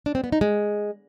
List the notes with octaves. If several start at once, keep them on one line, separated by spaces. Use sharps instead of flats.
D4
C4
B3
D#4
G#3